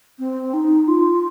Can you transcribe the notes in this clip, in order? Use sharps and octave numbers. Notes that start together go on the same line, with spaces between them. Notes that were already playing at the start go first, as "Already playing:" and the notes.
C4
D#4
F4